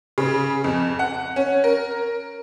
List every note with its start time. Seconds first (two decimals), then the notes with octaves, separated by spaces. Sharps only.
0.18 C#3
0.64 F2
0.99 F#5
1.36 C#4
1.64 A#4